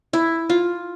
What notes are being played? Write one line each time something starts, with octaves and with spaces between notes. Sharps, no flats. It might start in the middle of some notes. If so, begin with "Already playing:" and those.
E4
F4